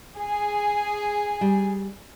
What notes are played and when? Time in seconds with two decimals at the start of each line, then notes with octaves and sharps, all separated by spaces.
0.16 G#4
1.41 G3